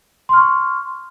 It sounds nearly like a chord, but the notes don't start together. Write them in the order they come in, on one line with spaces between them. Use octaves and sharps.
C6 F6 C#6